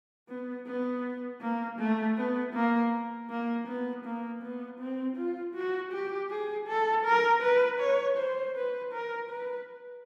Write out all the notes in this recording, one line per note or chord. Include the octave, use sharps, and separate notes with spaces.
B3
B3
A#3
A3
B3
A#3
A#3
B3
A#3
B3
C4
F4
F#4
G4
G#4
A4
A#4
B4
C#5
C5
B4
A#4
B4